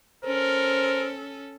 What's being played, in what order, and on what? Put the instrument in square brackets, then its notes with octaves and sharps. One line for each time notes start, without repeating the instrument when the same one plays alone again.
[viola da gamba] C#4 A4 [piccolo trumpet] A#4 [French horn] C5